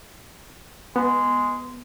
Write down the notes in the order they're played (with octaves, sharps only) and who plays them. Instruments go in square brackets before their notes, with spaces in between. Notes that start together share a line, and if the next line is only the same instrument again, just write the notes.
[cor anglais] G#3 [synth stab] B3